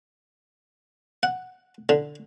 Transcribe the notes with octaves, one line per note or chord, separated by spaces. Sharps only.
F#5
D3